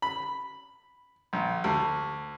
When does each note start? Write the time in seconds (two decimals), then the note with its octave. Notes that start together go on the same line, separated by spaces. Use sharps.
0.02 B5
1.33 A#1
1.64 D2